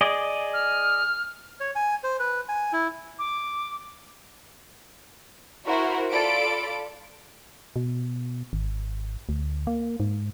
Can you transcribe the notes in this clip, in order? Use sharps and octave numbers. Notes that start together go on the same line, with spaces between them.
G#4 D5 D#5
F6
C#5
G#5
C5
B4
G#5
E4
D6
E4 F#4 A#4 C5
F4 A4 D5 B5 D7
B2
G#1
D2
A#3
G#2